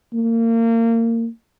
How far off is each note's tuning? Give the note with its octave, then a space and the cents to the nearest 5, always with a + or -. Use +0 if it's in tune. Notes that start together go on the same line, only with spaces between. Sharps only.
A#3 -30